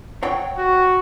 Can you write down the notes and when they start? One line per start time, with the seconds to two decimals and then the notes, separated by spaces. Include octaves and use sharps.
0.23 C#5 F#5 G5
0.58 F#4